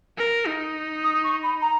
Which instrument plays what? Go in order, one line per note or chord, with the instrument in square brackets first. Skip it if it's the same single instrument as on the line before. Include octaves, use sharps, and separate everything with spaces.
[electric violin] A#4
D#4
[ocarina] D#6
C#6
B5
A#5